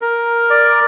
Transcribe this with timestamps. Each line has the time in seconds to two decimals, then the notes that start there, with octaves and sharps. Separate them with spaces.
0.01 A#4
0.50 D5